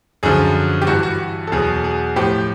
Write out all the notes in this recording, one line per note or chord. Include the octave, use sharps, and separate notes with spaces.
F#2 D3 F3 G#4
G4
G2 E3 F#4
F#4
A4
E2 B2 F#3 G#4
G#4
A2 F3 G4